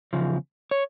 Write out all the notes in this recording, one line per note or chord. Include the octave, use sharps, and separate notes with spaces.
E2 C#3 F3
C#5